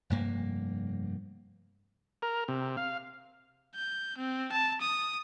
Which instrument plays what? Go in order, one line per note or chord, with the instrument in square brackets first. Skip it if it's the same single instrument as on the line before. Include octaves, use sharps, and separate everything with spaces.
[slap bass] F1 G2 A#3
[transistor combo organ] A#4
C3
F5
[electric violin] G6
C4
A5
D#6